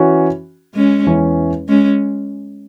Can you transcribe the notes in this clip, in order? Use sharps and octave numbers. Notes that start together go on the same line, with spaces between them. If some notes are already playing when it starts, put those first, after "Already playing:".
Already playing: E3 C#4 F#4
G#3 C#4
E2 E3 C#4
G#3 C#4